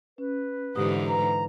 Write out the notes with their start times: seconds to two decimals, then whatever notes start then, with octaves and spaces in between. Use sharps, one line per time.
0.18 C#4 B4
0.76 G#2 D3 E3 G4 D#6
1.08 B4 A#5